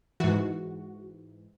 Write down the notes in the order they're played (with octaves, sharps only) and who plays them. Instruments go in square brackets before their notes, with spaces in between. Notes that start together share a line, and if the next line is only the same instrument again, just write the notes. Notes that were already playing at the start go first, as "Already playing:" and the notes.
[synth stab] G#2 E3 F#4